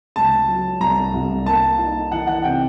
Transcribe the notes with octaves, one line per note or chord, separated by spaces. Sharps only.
C#2 A5
F#3
C2 A#5
C2
A#3 A5
D#4
E3 F#5
F#5
C3 G5